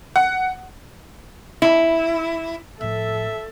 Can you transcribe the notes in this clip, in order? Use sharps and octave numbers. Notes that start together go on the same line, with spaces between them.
F#5
E4
A2 F3 A4 E5